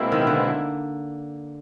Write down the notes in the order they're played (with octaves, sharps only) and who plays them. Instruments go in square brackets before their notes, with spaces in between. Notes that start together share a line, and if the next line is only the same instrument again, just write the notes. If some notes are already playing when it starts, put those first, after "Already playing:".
Already playing: [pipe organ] B2 G#3 C4 E4 [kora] A#3
[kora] D#3
D3